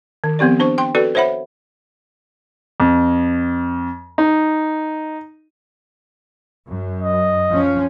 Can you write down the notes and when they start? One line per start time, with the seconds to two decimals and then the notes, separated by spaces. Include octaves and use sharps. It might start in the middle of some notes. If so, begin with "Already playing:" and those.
0.24 D#3
0.39 F3 B3 C4 G4 D5
0.59 D4 C5 C#6
0.78 G5 C6
0.95 F#4 A4 B4 D5
1.15 C5 C#5 E5 F#5 B5
2.80 F2
4.18 D#4
6.67 F#2
7.02 D#5
7.50 F3 C#4